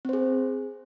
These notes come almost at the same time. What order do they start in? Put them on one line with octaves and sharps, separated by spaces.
C4 C5 G#4